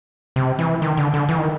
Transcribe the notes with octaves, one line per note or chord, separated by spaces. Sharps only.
C3
E3
D#3
D3
D3
E3
D#3